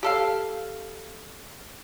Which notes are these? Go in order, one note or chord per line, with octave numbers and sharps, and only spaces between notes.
G4 A4 F5